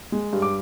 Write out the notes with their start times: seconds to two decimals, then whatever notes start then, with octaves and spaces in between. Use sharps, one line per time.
0.12 G#3
0.33 G2
0.42 D6